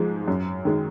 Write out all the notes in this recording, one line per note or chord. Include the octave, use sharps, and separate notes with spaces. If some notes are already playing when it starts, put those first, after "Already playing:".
Already playing: G#2 F3 G#3
F#2
D#3 G#3